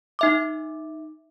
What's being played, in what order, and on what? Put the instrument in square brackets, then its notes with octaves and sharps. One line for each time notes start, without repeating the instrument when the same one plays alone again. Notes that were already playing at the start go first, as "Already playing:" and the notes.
[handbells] D#4 E5 D6